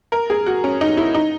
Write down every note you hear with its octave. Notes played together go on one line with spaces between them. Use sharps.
A#4
G#4
F#4
C#4
D#4
E4
D#4